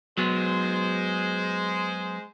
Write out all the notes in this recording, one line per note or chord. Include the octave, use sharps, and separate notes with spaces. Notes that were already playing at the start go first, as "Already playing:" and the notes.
F#3 G#3 B3 C5